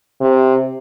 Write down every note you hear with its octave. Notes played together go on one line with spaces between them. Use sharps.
C3